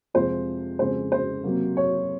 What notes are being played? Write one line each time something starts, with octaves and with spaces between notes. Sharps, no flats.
F2 C3 F3 G#3 C5
F2 C#3 G#3 C5
C5
C3 F#3 A#3
C#5